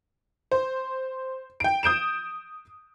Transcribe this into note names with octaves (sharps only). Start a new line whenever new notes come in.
C5
G5 D7
D#6 G6 D7 E7